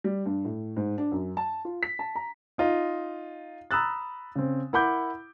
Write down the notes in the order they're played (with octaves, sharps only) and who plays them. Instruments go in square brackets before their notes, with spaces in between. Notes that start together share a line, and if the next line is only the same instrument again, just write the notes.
[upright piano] G3
G2
A2
G#2
D4
F#2
A5
F4
B6
A5
A#5
[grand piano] D#4 F4 D#5
A#5 B5 D#6 E6 F#6 A6
C#3 C4
E4 A#4 F#5 B5 D6 G6